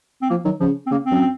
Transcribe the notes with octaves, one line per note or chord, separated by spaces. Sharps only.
C4
F3 A#3
D#3 F#3
C#3 F3
C4
C#3 A#3
C4
F#2